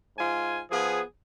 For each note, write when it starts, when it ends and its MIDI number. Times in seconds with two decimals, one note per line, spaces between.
0.17 0.59 44
0.17 0.59 65
0.17 0.59 80
0.70 1.01 53
0.70 1.01 59
0.70 1.01 68